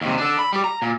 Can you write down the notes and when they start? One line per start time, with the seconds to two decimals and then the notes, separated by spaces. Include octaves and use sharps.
0.01 D#2 C3
0.18 D4 A4
0.39 B5
0.53 G3 G4
0.64 A#5
0.82 A#2